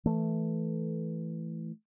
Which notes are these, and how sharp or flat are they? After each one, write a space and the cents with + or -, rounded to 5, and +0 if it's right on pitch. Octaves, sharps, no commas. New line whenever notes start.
E3 +0 A3 +0